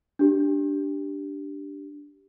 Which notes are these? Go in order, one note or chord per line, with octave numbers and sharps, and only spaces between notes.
D4 G4